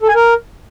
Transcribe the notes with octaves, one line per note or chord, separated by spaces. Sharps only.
A4
G#5
A#4